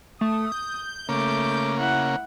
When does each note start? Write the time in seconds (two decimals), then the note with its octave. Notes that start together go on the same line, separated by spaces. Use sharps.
0.21 A3 D#6
0.52 G6
1.09 C#3 A3 A#3 D6
1.79 E4 F#5